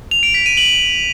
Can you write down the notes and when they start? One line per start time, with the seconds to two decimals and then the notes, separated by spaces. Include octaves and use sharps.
0.11 F7
0.23 D7
0.34 B6
0.46 D#7
0.57 F#7